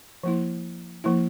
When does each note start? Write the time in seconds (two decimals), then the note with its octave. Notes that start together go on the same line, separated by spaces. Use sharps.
0.23 F3 A#3 E4
1.04 F3 A#3 E4